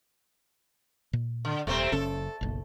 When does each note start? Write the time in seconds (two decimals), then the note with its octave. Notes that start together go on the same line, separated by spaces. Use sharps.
1.13 A#2
1.45 D3
1.67 D#1 C3 A3 C4
1.92 F#1 C#3 C#4 A4
2.41 F#1 B1